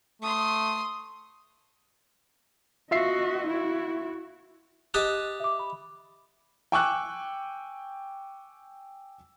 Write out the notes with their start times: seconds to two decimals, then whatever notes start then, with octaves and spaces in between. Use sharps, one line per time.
0.22 A3 C6 D#6
2.91 F4 F#4 D#5 E5 C7
3.46 E4 F#4
4.94 G4 D#5 A5 F#6
5.40 E5 D6
5.59 B5
6.72 G5 G#5 C#6 D6 E6 F#6